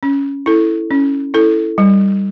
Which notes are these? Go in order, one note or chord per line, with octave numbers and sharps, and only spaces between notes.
C#4
E4 A4
C#4
E4 A4
G3